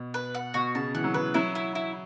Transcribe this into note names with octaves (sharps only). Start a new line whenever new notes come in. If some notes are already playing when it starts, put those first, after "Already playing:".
Already playing: B2
B4
F#5
B2 F#4
C#3 A5
E3 F#5
F#3
E3 B4
F#3 E4
E4
E4